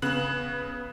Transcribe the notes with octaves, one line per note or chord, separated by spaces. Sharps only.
C#3 B3 F#6 F#7